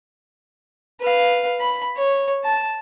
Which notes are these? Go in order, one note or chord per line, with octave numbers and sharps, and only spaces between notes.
B4 F5
B5
C#5
A5